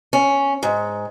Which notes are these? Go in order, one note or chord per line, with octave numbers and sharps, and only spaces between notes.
C#4
G#2